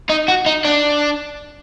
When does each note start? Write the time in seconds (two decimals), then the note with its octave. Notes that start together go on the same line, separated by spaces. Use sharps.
0.09 D#4
0.28 F#4
0.46 D#4
0.65 D4